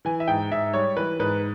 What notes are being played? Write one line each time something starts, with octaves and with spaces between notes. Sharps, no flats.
E3 G#5
E5
G#2 G5
G#2 E5
G3 C#5
E3 B4
G#2 B4